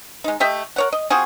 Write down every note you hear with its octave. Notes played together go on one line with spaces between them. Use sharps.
G#3 D#4
A3 G4 D#5 E5
A#4 C#5 F#5
D#5
C4 F4 F#4 G#4